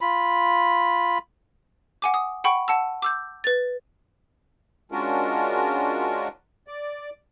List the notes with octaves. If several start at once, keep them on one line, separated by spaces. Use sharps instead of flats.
F4 B5
F#5 G#5 D6
D#6
F#5 G5 B5 C#6 D7
F#5 A5 E6
D6 E6 G6
B4 A6
G#3 C#4 D4 F4 F#4 A#4
D5